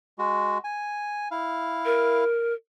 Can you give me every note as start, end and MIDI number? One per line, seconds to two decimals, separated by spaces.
0.18 0.58 56
0.18 0.58 66
0.64 1.28 80
1.31 2.24 64
1.31 2.24 77
1.85 2.54 70